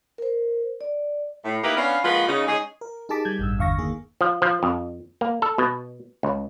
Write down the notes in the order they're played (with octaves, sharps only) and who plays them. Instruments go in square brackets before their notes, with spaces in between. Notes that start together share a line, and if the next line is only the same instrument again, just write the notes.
[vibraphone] A#4 C5
D5
[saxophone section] A2
A#3 D#4 E4 G4 A#4 B4
B3 C#4 D4 F5
F3 G#3 A#3 F4 F#4 B4
C#3 D#4
G#3 C#4 D#4 G#4
[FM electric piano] A#4
D#4 G4 G#4 A5 D6 B6
G3 G6 G#6
A1 G2 E6
G1 E2 D3 F5 C#6 A#6
D#3 A#3 G#4
[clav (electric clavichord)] F3
F3
F2
A#3
A4
B2
C#2